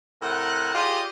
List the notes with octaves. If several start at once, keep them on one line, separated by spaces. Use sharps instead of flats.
A2 C3 A#4 F#5
F4 G4 G#4 D5 D#5